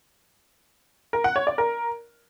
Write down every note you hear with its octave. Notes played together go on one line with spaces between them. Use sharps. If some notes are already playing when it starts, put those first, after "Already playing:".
A#4
F#5
C#5
D5
A#4